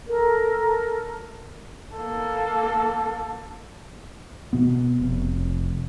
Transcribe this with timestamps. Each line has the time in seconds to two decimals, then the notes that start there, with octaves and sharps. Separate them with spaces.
0.08 A4 A#4
1.96 A#3 A4
4.53 B2 B3
4.99 F1